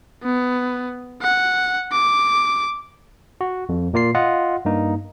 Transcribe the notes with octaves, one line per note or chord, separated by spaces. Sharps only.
B3
F#5
D6
F#4
F2
A#2 A#3 F4 C7
F4 D#5 F#5
G2 A#3 D#4